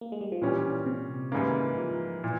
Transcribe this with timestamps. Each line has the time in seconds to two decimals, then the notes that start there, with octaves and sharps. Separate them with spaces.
0.01 A#3
0.12 G#3
0.21 G3
0.32 F3
0.42 A#2 E3 G3 C#4 G4
0.86 C3
1.32 G#2 C#3 E3 G3 A#3
1.78 F3
2.24 A#2 E3